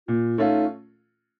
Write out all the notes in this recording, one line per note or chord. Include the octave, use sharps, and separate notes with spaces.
A#2 F4
A3 C#4 D#4 F4